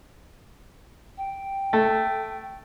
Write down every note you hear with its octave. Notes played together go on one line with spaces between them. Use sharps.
G5
A3